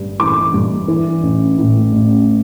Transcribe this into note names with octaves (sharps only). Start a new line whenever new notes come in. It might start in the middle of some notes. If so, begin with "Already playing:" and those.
Already playing: G1 G2
E3 D6
G2
E3
A1
A2
A1